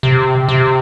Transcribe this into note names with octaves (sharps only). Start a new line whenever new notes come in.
C3
C3